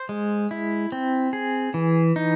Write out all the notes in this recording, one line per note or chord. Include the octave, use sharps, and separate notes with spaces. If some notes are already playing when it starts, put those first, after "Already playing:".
Already playing: C5
G#3
E4
C4
G#4
E3
D#4